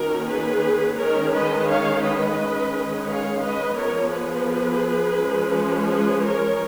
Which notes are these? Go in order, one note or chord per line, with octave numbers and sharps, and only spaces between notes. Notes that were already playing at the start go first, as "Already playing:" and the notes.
Already playing: D#3 A#3 C#4 F#4 A#4
G#4 B4
D#3 G#3 C#4 A#4 C#5
B4 D#5
C#5 F5
B4 D#5
D#3 G#3 C#4
C#5 F5
B4 D#5
F3 B3 A#4 C#5
G#4 B4
F3 G#3 C#4
G#4 B4
A#4 C#5